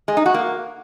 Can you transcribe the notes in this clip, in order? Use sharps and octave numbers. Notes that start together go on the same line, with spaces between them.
G#3
D#4
F#4
A#3